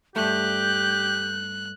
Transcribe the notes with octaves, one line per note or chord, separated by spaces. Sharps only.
G2 A3 G4 F#6 G6